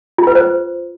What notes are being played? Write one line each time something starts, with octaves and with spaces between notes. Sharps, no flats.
F4
B4
C5